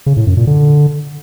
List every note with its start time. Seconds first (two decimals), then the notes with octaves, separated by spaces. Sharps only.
0.06 C#3
0.17 A2
0.27 F#2
0.37 A#2
0.47 D3